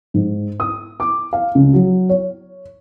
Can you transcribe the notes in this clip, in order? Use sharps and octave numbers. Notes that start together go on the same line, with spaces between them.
G#2
D#6
D6
F5
C#2
F#3
C#5